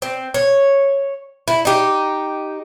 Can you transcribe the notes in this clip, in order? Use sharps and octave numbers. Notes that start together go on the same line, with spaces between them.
C4
C#5
E4
D#4 G4